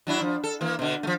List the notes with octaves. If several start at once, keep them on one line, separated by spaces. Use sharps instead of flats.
F#3 D4 E4
F3
A4
E3 A#3
B2 D3
F3 A3